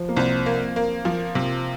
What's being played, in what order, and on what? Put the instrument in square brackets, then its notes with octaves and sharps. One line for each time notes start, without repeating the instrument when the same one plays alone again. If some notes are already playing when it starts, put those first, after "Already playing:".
Already playing: [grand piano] F3
A#3
[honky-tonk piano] C2 [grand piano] C4
[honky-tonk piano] A#3
A#3
F3
C3